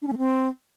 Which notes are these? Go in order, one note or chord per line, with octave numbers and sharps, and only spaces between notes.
D4
C#4
A3
C4